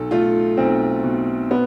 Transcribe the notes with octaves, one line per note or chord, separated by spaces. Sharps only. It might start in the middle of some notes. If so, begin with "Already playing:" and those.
Already playing: B1 A4
A3 F4
B1 C4
B2
B3